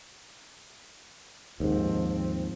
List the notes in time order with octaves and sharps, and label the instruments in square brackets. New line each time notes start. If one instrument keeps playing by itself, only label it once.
[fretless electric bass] D#2 G#2 [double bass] F3 C4